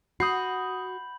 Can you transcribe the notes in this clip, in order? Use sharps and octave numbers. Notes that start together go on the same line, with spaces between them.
F#4 B5 D#6 G6 C7 F#7